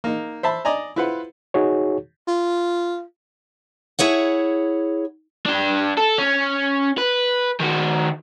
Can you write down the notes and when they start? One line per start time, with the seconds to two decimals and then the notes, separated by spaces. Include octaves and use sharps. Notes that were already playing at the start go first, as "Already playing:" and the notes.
0.04 A#3 D#4
0.43 C5 E5 A5 B5
0.65 D5 D#5 G#5 A#5
0.96 E4 F4 B4 C5 F#5
1.54 D#4 F#4 G#4 C#5
2.28 F4
3.99 E4 G#4 C#5 F#5
5.46 D4 G5
5.97 A4
6.18 C#4
6.98 B4
7.60 D#3 F#4